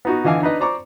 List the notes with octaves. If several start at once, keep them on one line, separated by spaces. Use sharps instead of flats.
B3 D#4 F#4
D3 E3 D#5 F5 G#5 D6
D4 D#4 B4 D#5
C5 D5 A#5 C#6 D6